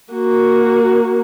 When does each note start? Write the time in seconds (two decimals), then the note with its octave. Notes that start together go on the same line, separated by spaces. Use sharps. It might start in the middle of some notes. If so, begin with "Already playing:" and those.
0.14 A#3 F#4